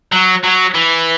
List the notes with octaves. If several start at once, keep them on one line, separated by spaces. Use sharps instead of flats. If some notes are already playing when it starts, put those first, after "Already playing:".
F#3
F#3
E3